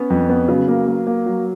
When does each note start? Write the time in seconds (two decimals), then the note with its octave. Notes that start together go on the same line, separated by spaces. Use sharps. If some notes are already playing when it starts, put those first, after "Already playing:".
Already playing: B3 C#4
0.10 F2
0.29 B3
0.48 C#3 F#3
0.68 A#3
0.87 A#3
1.07 A#3
1.26 F#3